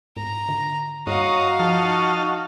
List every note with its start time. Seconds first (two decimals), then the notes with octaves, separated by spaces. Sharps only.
0.17 G#2 A#5
0.49 D3
1.07 G2 F#4 C#5 D#5 F5 A#5
1.59 F3 D#4 A5 F6